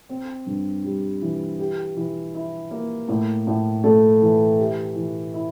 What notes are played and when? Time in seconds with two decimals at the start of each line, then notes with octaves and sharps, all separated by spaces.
0.09 C4
0.46 G2
0.84 G3
1.22 E3
1.59 G4
1.97 E3
2.35 E4
2.71 A#3
3.09 A2
3.47 A2
3.84 A3
4.22 E3
4.58 G4
4.96 E3
5.34 E4